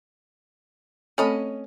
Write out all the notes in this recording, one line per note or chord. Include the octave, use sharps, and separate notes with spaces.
A3 C4 C#4 A4 D#5 B5